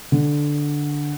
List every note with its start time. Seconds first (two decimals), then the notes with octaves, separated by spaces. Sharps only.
0.12 D3